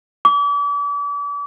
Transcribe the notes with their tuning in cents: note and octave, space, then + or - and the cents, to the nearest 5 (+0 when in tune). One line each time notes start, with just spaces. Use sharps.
D6 -40